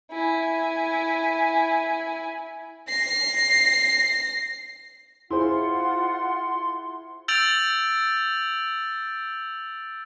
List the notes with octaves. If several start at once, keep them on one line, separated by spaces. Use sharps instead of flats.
E4 G#5
A#6 C7
E4 F4 G#4 C5 F#5 C6
E6 G6 A6 D7 F7 F#7